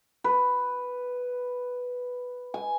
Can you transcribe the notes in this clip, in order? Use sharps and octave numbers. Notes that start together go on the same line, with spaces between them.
B4
G#5